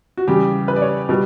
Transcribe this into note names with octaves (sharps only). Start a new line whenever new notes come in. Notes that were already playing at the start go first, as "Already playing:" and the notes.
F#4
E2 C#3 G3 G4
B4
D5
C#5
B2 G3